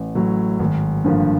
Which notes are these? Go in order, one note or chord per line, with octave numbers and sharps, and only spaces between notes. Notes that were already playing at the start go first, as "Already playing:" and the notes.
Already playing: A1
A2 F#3
G#1
G2 D3 F3 A#3